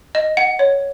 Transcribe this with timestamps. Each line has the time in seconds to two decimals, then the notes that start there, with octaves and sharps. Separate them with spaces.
0.15 D#5
0.37 F#5
0.59 C#5